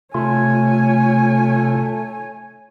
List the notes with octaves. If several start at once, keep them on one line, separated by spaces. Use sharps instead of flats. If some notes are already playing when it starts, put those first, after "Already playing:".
C3 A3 F4 C#5 G#5